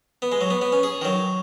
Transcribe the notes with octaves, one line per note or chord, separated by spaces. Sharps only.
B3
G#3
F#3
B3
B3
C#4
G#4
D#3
F#3